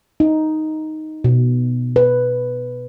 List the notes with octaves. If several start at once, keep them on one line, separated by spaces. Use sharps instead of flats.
D#4
B2
B4